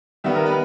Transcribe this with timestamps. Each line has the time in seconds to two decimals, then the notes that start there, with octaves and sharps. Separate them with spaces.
0.24 D#3 G3 B3 E5
0.35 A#4
0.46 B4